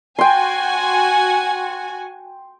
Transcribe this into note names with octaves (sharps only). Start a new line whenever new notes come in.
F#4 G5 G#5 C6